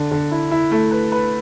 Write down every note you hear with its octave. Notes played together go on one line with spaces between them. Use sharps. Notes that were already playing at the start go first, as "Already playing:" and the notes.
Already playing: D3
D3
E4
E4
A3
B4
B4